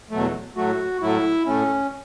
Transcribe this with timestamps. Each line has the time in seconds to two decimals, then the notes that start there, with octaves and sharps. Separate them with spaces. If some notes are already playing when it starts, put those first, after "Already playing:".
0.10 E2 B2 F#3 A3
0.56 A2 F#3 A3 F#4
1.01 A2 F#3 A3 E4
1.46 A2 A3 C#4